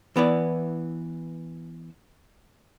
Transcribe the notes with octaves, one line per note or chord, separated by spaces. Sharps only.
E3 B3 E4 D5